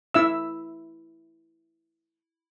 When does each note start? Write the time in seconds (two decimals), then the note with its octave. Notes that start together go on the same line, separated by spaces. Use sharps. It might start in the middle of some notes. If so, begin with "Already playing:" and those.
0.14 E4 E5 E6